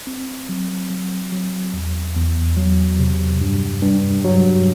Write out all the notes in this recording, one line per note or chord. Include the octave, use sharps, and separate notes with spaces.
C4
F#3
F#3
F#3
E2
E2
F#3
C3
G2
G2
F#3